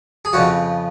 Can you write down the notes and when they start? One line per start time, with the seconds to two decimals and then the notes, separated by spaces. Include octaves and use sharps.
0.25 G#4
0.33 F2 C#3 F3 F#4